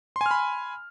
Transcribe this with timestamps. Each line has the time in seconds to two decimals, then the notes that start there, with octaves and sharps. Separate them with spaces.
0.16 C6
0.21 G#5
0.26 F6
0.31 B5